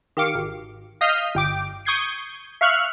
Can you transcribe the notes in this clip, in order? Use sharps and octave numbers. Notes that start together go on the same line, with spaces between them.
D#3 G4 F5 D6 C#7
G#1
D#5 F5 D#6 F6 G6 B6
G1 G5 D6
C#6 D#6 G6 G#6 C7 D7
E5 F5 C#6 F6 F#6